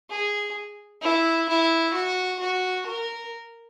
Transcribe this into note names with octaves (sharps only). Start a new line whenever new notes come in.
G#4
E4
E4
F#4
F#4
A#4